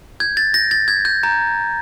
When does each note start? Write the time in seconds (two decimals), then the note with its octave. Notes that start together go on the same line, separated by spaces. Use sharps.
0.20 G6 G#6
0.37 A6
0.54 G6 A#6
0.71 A6
0.88 G6 G#6
1.05 G6
1.23 A#5 G6